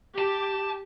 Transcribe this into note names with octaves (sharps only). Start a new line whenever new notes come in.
G4 A5